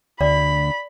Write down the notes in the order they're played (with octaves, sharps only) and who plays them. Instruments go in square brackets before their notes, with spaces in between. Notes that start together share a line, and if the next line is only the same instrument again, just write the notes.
[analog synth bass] D2 [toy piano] D5 [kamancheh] B5